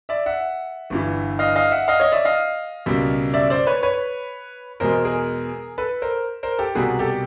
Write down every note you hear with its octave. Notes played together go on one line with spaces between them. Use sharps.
D5 E5
E5 F#5
G1 G2 E3
D#5 F5
D#5 F5
E5 F#5
D#5 F5
C#5 D#5
D5 E5
D#5 F5
C#2 B2 G3 A#3
D5 E5
C5 D5
B4 C#5
B4 C#5
E2 B2 G#3 A#4 C5
G#4 A#4
A4 B4
A#4 C5
A#4 C5
G4 A4
C2 B2 G3 A#3 F#4 G#4
G4 A4